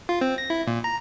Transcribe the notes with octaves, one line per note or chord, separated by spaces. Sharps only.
F4
C4
A#6
E4
A#2
A#5